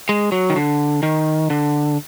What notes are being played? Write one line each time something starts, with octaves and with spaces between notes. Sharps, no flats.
G#3
F#3
D#3
D3
D#3
D3